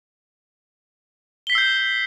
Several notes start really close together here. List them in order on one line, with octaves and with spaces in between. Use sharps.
G7 B6 C7 E6 G6